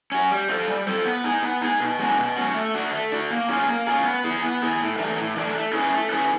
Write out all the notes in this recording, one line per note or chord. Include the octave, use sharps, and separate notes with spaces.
C#4 F#4
G3
C4 F4 A4 C5
G3
C4 F4 A4 C5
B3
D#4 G#4
B3
D#4 G#4
B2
G#3 C#4 F#4
B2
G#3 C#4 F#4
A3
D4 F#4
A3
D4 F#4
A#3
C#4 F4 G#4
A#3
C#4 F4 G#4
B3
E4 G#4
B3
E4 G#4
A2
E3 A3 D4
A2
E3 A3 D4
A3
C#4 E4 G#4 B4
A3
C#4 E4 G#4 B4